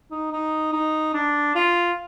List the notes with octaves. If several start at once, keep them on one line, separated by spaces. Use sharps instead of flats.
D#4
D#4
D#4
D4
F4